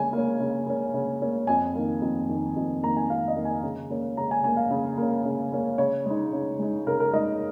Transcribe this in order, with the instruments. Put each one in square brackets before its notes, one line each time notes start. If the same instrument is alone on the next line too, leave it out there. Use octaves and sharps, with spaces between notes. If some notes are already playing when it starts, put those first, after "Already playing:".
Already playing: [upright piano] C#3 A#3 C#4 G#5
A#3 C#4
C#3
A#3 C#4
C#3
A#3 C#4
F2 G#5
D#3 A#3
F2
D#3 A#3
F2
D#3 A#3 A#5
G#5
F2 F5
D#5
D#3 A#3
G#5
C#3
A#3 C#4
C#3 A#5
G#5
A#3 C#4 G#5
F5
C#3
A#3 C#4
C#3
A#3 C#4
C#3 C#5
G#3 D#4
C#3
G#3 D#4
C#3 A#4
A#4
G#3 D#4 D#5